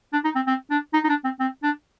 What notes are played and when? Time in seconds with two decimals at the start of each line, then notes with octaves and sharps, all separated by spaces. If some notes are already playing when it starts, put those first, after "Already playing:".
0.13 D4
0.24 D#4
0.35 C4
0.47 C4
0.70 D4
0.94 D#4
1.04 D#4
1.09 D4
1.24 C4
1.40 C4
1.63 D4